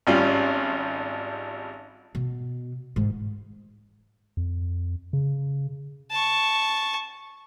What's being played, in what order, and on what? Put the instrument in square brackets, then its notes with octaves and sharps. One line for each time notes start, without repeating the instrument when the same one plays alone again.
[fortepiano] G#1 G3 C#4 F4
[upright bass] B2
G#2 D#3
[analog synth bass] F2
C#3
[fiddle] A5 C#6